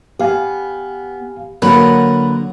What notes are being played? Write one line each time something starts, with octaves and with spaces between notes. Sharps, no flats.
B3 G4 F5 G#5
D3 F#3 A#3 A#4 B4